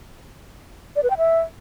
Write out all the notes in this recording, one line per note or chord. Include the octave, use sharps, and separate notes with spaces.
D5
B4
G5
E5